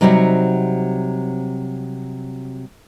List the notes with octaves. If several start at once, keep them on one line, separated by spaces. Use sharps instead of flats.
C3 F#3 G3 C4 D#4 F#4